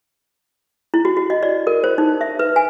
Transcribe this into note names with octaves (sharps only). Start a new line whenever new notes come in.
E4
F#4
F#4
D#5
D5
A#4
C5
D#4
E5
B4
G#5